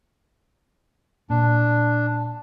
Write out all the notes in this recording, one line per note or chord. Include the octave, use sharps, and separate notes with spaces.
A#2 D4